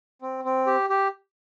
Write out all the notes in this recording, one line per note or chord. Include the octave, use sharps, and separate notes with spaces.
C4
C4
G4
G4